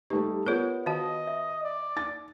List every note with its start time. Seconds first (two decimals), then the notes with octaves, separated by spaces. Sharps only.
0.10 G3 A3 D#4 G4 B4
0.46 B3 F4 G#4 A#4 C#5 D5
0.86 D#3 F#4 D#5 F5 A5
1.27 E5
1.63 D5
1.97 D#4 A6